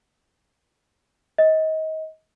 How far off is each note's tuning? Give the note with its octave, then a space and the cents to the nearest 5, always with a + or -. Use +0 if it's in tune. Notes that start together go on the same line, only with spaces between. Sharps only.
D#5 +25